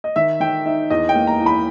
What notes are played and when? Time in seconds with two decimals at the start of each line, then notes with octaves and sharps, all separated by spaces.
0.04 D#5
0.16 D#3 E5
0.40 D#3 G5
0.65 D#4 E5
0.90 E2 D#5
1.09 G5
1.15 A#3
1.27 A#5
1.40 E3
1.46 B5